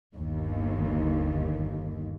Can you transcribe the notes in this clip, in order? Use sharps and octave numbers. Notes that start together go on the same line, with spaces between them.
G1 D#2